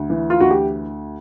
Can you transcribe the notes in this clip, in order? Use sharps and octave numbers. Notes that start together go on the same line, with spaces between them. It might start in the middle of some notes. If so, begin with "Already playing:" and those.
Already playing: D2
E3
F4
D2 F#4
G4